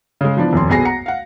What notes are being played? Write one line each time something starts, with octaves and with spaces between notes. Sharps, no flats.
C#3 G#3
E3 F3 B3 D4
D#1 F2 C6
B1 B3 G#4 G#5 A#6 C7
F#5 A#5 C#7
F5 F#5